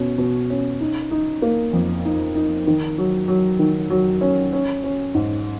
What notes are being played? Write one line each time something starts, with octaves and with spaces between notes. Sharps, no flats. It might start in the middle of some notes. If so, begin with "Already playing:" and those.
Already playing: B2 C#4
B2
C#4
D#4
D#4
A#3
F2
D#4
D#4
D#3
F#3
F#3
D#3
F#3
C#4
C#4
C#4
G#2